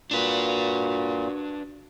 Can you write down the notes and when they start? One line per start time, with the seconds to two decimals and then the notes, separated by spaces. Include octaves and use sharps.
0.11 A#2 D4 F#4 B4